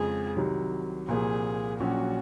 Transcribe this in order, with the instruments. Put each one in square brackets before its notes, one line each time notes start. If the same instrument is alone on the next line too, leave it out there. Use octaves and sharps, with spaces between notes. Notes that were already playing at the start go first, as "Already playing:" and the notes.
Already playing: [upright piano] F2 C#3 F3 G#3 [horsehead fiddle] G#4
[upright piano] C2 C3 D#3 F#3
[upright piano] C2 A#2 F3 A#3 [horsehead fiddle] G#4
[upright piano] A#1 A#2 F#3 C#4 [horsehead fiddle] F#4